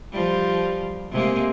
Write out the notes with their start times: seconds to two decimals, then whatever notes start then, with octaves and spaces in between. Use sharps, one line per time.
0.12 F3 G3
1.11 C3 G#3 A#3